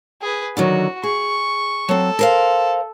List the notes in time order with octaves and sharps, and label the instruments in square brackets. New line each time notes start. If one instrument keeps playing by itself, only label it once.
[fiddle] G#4 B4
[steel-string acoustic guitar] D3 D#3 F#3 [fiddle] F#4
[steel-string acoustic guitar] G#4 [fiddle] C#6
[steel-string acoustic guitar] F#3 C4 [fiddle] A4
[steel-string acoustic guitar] A#4 C5 F5